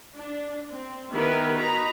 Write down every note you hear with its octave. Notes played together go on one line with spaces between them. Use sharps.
D4
C4
D#3 B3 E4 G4 A#4 B4
D#4 F#4 A#5 B5